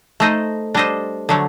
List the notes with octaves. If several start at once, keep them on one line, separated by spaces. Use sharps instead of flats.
A3 D#4 A4 C5 D#5
G3 D4 A4 C5 D#5
D3 F#3 A3